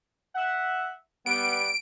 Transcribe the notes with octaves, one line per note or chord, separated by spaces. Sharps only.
E5 F#5
G3 B3 D7